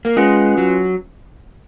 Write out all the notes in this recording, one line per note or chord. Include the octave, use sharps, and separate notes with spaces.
A#3
G#3 C#4 F4 B4 F#5
F#3